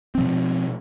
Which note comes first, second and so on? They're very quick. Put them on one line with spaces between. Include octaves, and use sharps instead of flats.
C4 F3 B2